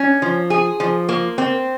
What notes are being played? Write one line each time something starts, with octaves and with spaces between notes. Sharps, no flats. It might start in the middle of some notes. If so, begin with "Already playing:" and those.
Already playing: C#4
F3
G#4
F3
A#3
C4